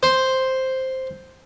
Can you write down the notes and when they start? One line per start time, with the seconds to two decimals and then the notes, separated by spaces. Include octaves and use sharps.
0.03 C5